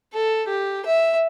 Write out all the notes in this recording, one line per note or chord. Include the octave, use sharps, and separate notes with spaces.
A4
G4
E5